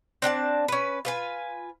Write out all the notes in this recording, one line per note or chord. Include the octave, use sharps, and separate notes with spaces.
C4 D4 G5 A5
C#4 B4
F4 B4 G#5